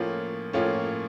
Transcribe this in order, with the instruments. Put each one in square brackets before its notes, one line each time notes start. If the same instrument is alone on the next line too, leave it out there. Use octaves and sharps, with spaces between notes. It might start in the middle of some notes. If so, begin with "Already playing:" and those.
Already playing: [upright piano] A2 F3 A#3 C#4 F4
A2 F3 A#3 C#4 F4